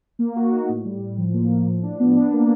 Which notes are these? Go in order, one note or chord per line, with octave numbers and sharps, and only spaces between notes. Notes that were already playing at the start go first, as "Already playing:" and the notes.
A#3
F#4
D#4
A2
G3
A2
F3
A#3
F3
A2
D4
B3
D4
A#3